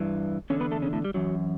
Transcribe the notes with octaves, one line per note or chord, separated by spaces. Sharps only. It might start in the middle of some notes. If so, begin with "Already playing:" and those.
Already playing: G2 E3
E2 D3 C#4 C#5
B3 B4
A3 A4
C#3 C#4
A2 A3
G3
F#2 E3 F#3